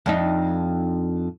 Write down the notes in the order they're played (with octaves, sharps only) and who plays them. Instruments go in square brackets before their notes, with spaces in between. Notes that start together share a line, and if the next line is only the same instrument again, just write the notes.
[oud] F2 D4 D#4